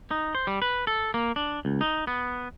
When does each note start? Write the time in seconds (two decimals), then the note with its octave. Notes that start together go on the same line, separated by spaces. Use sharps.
0.11 D#4
0.35 C5
0.47 G3
0.62 B4
0.87 A4
1.14 A#3
1.36 D4
1.65 C#2
1.81 D#4
2.07 B3